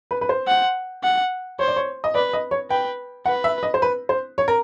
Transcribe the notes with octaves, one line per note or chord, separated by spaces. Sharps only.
B4
B4
C5
F#5
F#5
C5 C#5
D5
C#5
D#5
B4 D5
D#5
C#5
B4 G5
B4 F#5
E5
D#5
C5
B4
C5
C#5
A#4